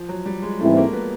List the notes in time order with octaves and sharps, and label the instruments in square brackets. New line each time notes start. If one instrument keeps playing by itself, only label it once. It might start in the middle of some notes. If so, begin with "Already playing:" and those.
Already playing: [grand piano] F3
F#3
G3
G#3
[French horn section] G#2 E3 G3 C4 E4 [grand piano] A3
[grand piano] A#3
B3